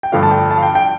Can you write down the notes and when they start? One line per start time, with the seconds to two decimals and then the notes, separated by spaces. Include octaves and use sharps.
0.03 G5
0.12 G2 D3 F3 A3 D4 F5
0.23 A5
0.31 G5
0.51 A5
0.58 F5
0.63 G5
0.75 G5